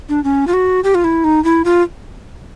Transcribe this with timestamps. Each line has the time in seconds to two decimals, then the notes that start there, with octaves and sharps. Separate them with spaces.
0.09 D4
0.24 C#4
0.47 F4
0.53 F#4
0.84 G4
0.95 F4
1.04 E4
1.24 D#4
1.44 E4
1.65 F4